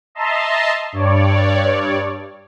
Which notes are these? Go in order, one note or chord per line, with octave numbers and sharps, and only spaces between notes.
D#5 E5 A5 A#5 C6
G2 C#5 D5